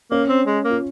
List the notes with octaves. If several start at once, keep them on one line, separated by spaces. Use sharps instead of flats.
A#3 C#4
C4
G#3
A#3
F4